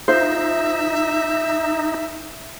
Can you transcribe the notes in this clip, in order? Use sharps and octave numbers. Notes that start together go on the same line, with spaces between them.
D#4 F4 C5 E5